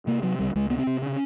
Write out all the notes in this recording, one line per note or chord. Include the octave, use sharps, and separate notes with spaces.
C3 A#3
C3 F#3
C#2 G3
C#2 G#3
C3 B3
C4
C3
C#3 C#4